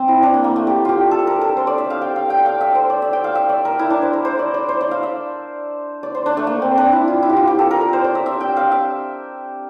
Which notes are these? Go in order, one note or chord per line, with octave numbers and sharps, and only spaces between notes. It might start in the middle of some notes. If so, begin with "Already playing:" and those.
Already playing: C4
E4
D4
A#3
A#3
A3
G4
F4 G4
A4
A#4
A4
C5
D5
E5
F5
G5
F5
G5
F5
E5
C5
D5
E5
G5
F5
E5
D5
A#4
E4
D4
C5
A#4
C5
D5
D5
C5
D5
F5
E5
D5
C5
D4
A3
A#3
C4
D4
E4
F4
E4
G4
F4
G4
A4
A#4
A#4
C5
D5
E5
E5
G5
F5
E5